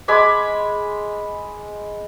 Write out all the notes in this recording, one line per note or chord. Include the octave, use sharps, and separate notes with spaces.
G#3 G#5 B5 D6